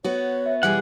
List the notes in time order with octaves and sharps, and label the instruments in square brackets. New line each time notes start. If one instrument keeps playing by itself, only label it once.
[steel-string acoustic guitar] B3 F#4 [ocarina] C#5
[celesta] E5
[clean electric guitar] B1 F#5 [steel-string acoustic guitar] E3 G3 G#4